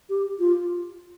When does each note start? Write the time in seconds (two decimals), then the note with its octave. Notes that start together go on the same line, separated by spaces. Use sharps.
0.09 G4
0.39 F4